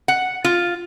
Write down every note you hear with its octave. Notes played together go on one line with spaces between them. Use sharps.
F#5
F4